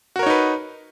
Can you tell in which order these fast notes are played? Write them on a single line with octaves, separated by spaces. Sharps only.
F#4 A#4 C#5 D#4 B4